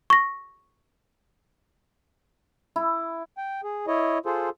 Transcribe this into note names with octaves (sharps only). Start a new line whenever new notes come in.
C#6 A#6
E4
G5
G#4
E4 C#5 D#5
F4 G#4 A4 C5